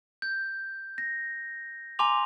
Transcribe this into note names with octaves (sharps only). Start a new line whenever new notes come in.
G6
A#6
G#5 A#5 C6 D6 F7